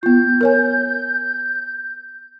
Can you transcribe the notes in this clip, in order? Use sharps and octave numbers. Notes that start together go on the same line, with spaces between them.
B3 F4 G6
A#4 C#5 G#5